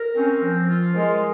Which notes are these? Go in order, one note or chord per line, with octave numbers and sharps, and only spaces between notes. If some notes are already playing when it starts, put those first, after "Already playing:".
Already playing: A#4
C4 C#4
F3
F4
G#3 A#4